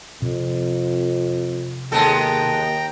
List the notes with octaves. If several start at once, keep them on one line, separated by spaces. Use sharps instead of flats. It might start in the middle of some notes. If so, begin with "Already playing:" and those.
F2 C3
D#2 G#3 B3 A4 G5 A#5